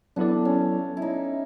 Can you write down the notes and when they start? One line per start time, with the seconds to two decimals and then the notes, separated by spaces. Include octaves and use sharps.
0.16 F#3 B3 D4 E4 A4 D5
0.45 C#4
0.97 E4
1.02 D#4